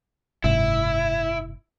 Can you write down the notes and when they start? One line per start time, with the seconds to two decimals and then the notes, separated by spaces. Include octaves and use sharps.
0.44 F#1 G#2 C3 E4